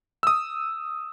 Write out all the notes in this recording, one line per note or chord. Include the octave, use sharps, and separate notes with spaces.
D#6 E6